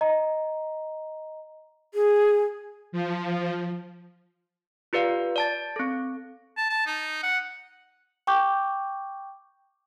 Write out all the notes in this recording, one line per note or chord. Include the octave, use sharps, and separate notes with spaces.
D#5 A#5
G#4
F3
F4 G4 B4 D5 F5
D5 A5 A6
C4 A4
A5
A5
D#4
F#5
G5 C#6 D6 G6